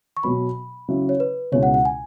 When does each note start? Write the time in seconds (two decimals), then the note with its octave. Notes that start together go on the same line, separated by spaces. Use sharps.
0.17 C#6
0.23 B2 F#3 B3 B5
0.88 C#3 F#3 E4
1.09 C#5
1.20 B4
1.52 C#2 B2 G#3 E4 C#5
1.63 F#5
1.74 F#5
1.85 G#5